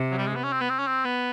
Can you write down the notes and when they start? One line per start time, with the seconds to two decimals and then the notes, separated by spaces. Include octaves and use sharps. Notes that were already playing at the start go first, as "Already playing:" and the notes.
Already playing: C3
0.11 F#3
0.18 G3
0.27 G#3
0.36 B3
0.44 C#4
0.53 C4
0.61 B3
0.70 C4
0.79 C#4
0.87 C4
1.05 B3